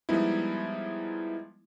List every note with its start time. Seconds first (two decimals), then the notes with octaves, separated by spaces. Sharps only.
0.09 F3 G3 G#3 B3 D#4 E4